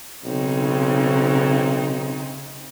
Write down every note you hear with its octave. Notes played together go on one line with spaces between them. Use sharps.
B1 C#3 C4 D#4